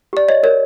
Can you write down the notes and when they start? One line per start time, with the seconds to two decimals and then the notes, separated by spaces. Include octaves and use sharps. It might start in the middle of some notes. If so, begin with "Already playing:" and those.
0.13 G4 D5
0.28 C#5 D#5
0.43 A#4 C#5